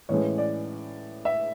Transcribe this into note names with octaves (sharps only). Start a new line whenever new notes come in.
A2 E3 G#3 C#4 C#5
D5
E5